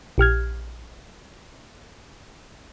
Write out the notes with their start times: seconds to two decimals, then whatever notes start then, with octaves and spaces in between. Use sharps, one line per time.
0.18 A#1 G4 F6 G#6